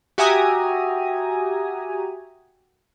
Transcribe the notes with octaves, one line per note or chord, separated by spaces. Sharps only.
F#4 G4 E5 G#5 A#5 D#6